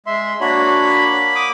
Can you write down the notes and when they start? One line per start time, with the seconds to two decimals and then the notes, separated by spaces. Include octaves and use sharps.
0.06 G#3 E5 C6
0.41 A#3 D4 F#4 C#5 B5
1.35 D6 D#6